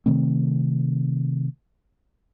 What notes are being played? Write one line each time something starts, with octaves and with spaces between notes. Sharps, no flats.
C3 D#3 A3 C4